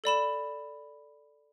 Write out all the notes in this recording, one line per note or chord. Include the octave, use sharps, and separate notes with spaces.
A4 D5 B5 E7